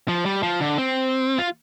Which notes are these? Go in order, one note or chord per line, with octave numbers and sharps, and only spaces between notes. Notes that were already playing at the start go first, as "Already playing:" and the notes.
F3
G3
F3
D3
C4
F4